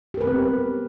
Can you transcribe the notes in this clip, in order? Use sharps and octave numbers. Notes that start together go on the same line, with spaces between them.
B3 C4 G4 A#4 B4